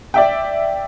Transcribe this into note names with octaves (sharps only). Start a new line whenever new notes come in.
D5 E5 G5